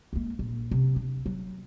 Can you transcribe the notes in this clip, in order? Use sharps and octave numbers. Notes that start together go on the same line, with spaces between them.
G#3 A#3
A#1
C3
D4
F#3